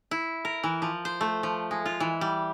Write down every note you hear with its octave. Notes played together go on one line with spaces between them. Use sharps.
E4
A#4
E3
F3
C5
A3
F3
G#3
F4
E3
G3